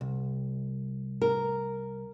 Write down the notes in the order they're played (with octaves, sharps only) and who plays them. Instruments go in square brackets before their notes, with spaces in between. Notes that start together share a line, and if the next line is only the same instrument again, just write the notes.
[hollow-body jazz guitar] C2
[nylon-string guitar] A#4